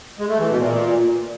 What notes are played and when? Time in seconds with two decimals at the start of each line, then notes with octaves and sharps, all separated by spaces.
0.19 G#3
0.29 A3
0.39 E3
0.49 B2
0.59 A#2